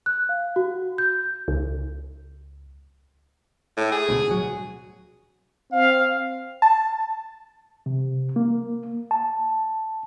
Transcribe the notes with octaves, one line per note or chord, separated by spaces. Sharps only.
F#6
F5
F#4
G6
C#2
A2
G#4
D2 B2
D1 F#3
C4 F5
A5
C3
A#3
A5